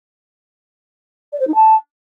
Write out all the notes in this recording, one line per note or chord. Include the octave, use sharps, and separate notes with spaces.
D5
C5
D#4
A5